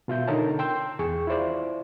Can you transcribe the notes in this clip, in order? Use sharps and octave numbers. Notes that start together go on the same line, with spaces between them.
B2 F4 E5 G6
D3 D#4 A4 A#4 C#5 A5
G5 C6 E6 G6
E2 G#4 C#6
E4 F4 C5 D5